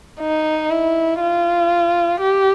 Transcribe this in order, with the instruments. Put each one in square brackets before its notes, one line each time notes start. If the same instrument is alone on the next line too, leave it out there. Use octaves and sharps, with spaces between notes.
[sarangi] D#4
E4
F4
G4